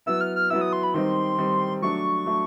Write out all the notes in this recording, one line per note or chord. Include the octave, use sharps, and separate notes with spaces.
F#3 B3 E4 E6
F6
F6
F#3 B3 E4 E6
D#6
C6
B5
D#3 G3 C4 D#4 C6
D#3 G3 C4 D#4
F#3 A3 D4 C#6
F#3 A3 D4